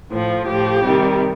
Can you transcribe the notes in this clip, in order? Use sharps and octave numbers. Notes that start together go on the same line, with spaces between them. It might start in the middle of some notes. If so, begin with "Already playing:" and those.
A2 F3
A2 F3 G4
C3 D#3 G3